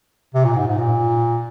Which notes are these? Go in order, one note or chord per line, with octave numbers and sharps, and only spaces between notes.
C3
A#2
G#2
G#2
A#2